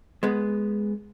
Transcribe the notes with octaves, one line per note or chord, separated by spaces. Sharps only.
G#3 B3